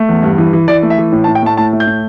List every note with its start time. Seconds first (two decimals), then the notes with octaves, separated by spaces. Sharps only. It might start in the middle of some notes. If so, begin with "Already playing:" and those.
Already playing: A3
0.09 E2
0.23 G2
0.38 E3
0.53 E3
0.68 E3 D5
0.83 A3
0.90 E5
0.98 E3
1.12 A2
1.24 A5
1.28 A2
1.35 G5
1.42 A3 A5
1.57 A2 A5
1.73 A3
1.80 G6
1.87 A2